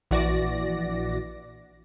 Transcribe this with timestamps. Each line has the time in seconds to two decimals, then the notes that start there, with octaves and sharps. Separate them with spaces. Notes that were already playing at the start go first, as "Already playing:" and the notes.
0.11 A#1 E3 F#4 D5 A#6